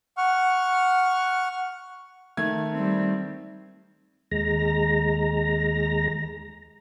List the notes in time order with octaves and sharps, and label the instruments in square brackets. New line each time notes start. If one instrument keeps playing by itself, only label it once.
[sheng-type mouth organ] F#5 C#6 F6
[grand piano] D#3 A3 G#6
[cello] G3 C4
[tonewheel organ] D#2 G#3 A#5